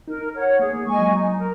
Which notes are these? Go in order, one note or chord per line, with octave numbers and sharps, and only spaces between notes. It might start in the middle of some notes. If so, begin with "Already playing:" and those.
D#4 A#4
C#5 F#5
A#3 G#4
A#3
G#3 D#5 G#5 C#6
F#3
D#4
A#4